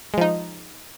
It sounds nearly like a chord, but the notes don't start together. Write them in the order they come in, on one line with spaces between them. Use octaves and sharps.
G#3 F3 D#4